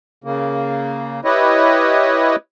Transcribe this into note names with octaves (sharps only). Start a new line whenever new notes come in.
C#3 A#3
E4 G4 B4 C#5 D#5